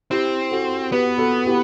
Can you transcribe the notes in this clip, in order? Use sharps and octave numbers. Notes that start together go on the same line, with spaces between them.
C4 E4 G4
F#4 A4
B3 G4 B4
F#4 A4
E4 G4